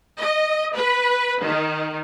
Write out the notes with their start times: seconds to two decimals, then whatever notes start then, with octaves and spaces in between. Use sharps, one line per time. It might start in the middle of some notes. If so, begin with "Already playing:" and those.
0.18 D#5
0.75 B4
1.43 D#3